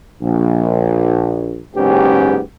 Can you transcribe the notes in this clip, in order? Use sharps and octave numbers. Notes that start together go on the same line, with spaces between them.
A#1
F#1 G#2 B3 C#4 G4